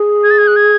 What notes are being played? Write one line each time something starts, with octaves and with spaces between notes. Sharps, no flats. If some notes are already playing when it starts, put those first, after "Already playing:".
Already playing: G#4
G#6
A6
G#6
F#6
G#6